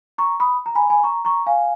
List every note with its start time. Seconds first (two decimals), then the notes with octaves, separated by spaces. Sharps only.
0.18 A#5 C#6
0.40 B5 D#6
0.66 A#5
0.75 G#5 B5
0.90 G#5 B5
1.03 A#5 C#6
1.25 A#5 C#6
1.46 F5 G#5